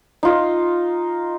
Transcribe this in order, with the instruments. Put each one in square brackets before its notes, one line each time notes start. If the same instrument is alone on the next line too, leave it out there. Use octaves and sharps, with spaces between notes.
[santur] D#4 F4 D#5